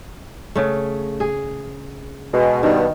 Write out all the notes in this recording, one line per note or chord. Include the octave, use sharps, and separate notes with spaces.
C#3 A3
G#4
B2 G#3
G2 B2 D#3